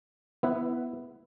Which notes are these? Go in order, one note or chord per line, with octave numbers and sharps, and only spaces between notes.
B3 E4 B4